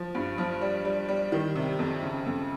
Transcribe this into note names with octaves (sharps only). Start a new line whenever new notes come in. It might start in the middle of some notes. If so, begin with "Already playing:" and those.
Already playing: F3
G2
F3
G3
G3
G3
D#3
C3
F2
C#3
F2